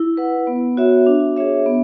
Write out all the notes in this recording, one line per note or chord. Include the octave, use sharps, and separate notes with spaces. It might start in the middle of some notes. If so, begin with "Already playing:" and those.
Already playing: E4
B4 F#5
B3
F#4 C#5 E5
D4
G#4 C#5 E5
B3